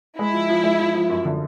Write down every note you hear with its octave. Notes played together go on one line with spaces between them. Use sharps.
G#3 E4
F3
F3
G#3
F3
F3
F#2
D3